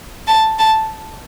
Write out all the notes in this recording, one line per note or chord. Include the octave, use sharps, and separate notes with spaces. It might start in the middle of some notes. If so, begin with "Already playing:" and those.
A5
A5